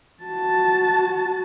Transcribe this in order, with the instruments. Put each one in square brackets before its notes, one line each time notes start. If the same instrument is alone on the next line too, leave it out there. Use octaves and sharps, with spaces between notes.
[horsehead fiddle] F#4 A5